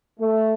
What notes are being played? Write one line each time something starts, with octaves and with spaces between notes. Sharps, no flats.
A3